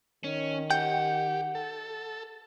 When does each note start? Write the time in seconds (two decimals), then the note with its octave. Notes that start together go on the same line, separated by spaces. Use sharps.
0.24 D#3 C#4
0.71 G4 F#5 G5
1.55 A4